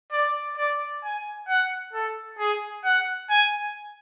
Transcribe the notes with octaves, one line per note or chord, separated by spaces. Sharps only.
D5
D5
G#5
F#5
A4
G#4
F#5
G#5